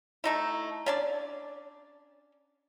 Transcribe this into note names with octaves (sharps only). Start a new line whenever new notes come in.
A3 D#4 E4
C#4 D4 D5